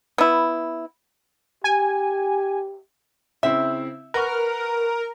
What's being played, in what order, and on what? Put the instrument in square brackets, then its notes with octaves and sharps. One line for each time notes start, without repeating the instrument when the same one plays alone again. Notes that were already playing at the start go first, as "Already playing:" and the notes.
[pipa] B3 E4
[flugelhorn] G4 [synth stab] G#5
[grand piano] C#3 C4 E4 [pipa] E5
[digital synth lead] A#4 [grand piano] B4 F#5 C#6